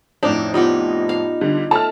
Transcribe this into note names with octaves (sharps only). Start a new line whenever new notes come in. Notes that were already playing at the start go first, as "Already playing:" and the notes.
F2 A2 D4 D#4 F5
B3 D#4 F4 G4
F5
D3 G3
A3 A5 F6